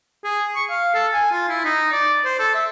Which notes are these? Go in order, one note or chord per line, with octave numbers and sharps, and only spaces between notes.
G#4
C#6
F5
A4
G#5
F4
E4
D#4
D5
C5
A4
E5